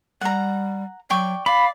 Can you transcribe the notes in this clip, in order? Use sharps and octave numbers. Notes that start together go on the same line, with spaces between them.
G3 F#5 A#5
F#3 D5 G5 C#6
D5 F5 B5